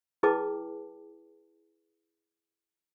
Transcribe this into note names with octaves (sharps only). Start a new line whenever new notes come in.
E4 G#4 B4 G5 A5 D6